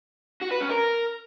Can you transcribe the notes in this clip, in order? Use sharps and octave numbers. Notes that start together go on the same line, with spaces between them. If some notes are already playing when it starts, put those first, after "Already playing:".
F#4
B4
C#4
A#4